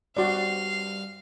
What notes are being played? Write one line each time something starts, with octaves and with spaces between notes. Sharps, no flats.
G2 C4 F#4 D5 F5